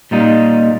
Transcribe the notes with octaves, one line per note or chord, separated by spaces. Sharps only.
A#2 G3 A#3 D#4